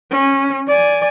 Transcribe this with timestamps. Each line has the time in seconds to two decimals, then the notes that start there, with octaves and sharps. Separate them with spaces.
0.11 C#4
0.68 D5 G#5